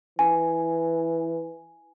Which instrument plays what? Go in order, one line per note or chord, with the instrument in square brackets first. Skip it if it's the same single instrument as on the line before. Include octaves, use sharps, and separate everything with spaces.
[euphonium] E3 [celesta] G#5